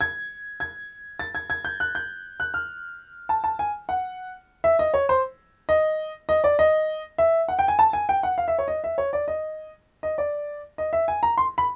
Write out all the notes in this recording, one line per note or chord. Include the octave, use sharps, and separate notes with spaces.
G#6
G#6
A6
G#6
G#6
G6
F#6
G6
F#6
F6
A5
A5
G#5
F#5
E5
D#5
C#5
C5
D#5
D#5
D5
D#5
E5
F#5
G5
G#5
A5
G#5
G5
F#5
F5
E5
C#5
D#5
E5
C#5
D5
D#5
D#5
D5
D#5
E5
G#5
A#5
C6
B5